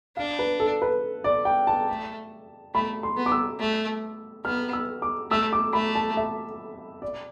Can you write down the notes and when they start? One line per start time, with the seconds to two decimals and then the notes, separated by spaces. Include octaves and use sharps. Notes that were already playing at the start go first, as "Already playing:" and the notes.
0.17 D4 F5
0.39 B4
0.60 A4
0.82 B4
1.24 D5
1.45 G5
1.67 A5
1.89 A3
2.74 A3 B5
3.03 C6
3.17 B3
3.26 D6
3.32 E6
3.60 A3
4.45 B3 F6
4.73 E6
5.02 D6
5.31 A3 E6
5.53 D6
5.73 A3 B5
5.95 A5
6.17 E5
7.02 D5